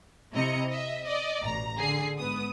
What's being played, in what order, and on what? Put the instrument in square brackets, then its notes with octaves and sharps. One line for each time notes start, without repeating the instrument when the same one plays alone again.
[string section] C3 E4 D#5 A#5 C#7
D#5 E5
D5 D#5
A1 B2 A#5
D3 G#4 C7
G#2 B3 D#6